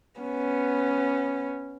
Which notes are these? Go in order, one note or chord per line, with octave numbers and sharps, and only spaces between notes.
B3 C#4